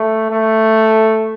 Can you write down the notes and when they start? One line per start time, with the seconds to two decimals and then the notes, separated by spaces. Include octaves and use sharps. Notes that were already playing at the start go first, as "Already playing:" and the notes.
Already playing: A3
0.30 A3